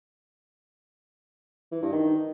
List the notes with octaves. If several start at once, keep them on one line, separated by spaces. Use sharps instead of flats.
E3
G2
D#3